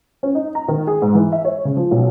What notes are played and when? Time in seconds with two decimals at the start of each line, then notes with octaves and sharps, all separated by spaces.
0.23 C#4
0.35 D#4
0.55 A#5
0.68 D#3
0.87 G#4
1.02 G#2
1.15 E3
1.32 E5
1.45 C#5
1.65 C#3
1.77 F3
1.91 B1